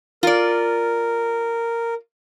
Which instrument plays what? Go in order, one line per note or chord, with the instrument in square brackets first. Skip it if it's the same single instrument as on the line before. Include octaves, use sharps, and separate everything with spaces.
[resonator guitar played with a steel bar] F4 D5 [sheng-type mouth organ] A#4